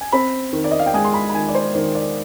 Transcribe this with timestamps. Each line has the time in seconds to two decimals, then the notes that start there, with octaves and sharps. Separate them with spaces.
0.01 G#5
0.12 C4 B5
0.53 D#3
0.64 D5
0.71 D#5
0.79 F5
0.86 G5
0.94 G#3 G#5
1.05 C6
1.14 B5
1.29 B5
1.34 D#3 G#5
1.48 D5
1.55 C5
1.74 D#3 C5
1.95 D5